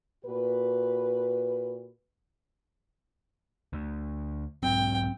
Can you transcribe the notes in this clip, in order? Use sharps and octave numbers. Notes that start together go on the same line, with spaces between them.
A#2 F#4 B4
D2
B1 G#2 F#3 C4 G5